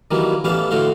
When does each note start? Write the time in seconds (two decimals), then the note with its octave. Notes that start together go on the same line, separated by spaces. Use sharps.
0.11 D#3 E3 F#3 G3 A#3
0.44 A1 E3 G3 B3 F5 A5
0.71 A2 D3 A3 F#4 F5 C6